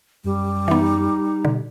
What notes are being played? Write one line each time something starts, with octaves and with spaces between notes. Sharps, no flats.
F#2 G3
E3 B3 D#4
B2 D3